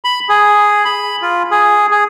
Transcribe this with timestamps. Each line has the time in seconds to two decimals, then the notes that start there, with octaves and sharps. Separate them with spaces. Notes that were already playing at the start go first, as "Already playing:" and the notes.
0.04 B5
0.29 G#4
0.85 B5
1.22 F4
1.51 G#4
1.91 G#4